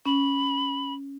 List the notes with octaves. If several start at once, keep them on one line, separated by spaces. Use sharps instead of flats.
C#4 B5